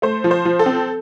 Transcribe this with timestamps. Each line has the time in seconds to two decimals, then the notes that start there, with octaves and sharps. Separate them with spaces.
0.02 A3 C5
0.24 F3
0.31 C5
0.45 F3
0.59 A4
0.66 C4